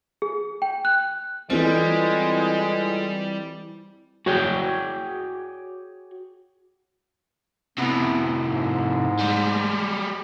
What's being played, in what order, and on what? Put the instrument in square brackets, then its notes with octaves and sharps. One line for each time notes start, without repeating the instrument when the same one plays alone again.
[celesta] G#4
G5
F#6
[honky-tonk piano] E3 C4 [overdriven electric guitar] G3 [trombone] G#3 [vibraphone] F4 A4 B4
[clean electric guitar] F#4 G#4 C#5 D5 G5
[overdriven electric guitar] A2 C3 [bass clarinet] B3
[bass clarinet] G#2
[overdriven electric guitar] G3 G#3